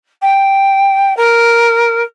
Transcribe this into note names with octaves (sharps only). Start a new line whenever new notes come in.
G5
A#4